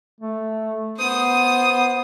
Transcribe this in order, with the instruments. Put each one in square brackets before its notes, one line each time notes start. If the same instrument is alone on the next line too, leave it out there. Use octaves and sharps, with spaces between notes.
[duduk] A3
[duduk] B3 [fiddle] C5 D#6